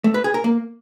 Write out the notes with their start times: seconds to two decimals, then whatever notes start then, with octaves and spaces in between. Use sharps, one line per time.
0.04 A3
0.14 B4
0.24 G#4
0.34 A#4
0.44 A#3